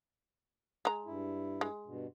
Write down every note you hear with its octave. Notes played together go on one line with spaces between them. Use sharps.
G#3 A#5
G2 E4
G#3
G2 B2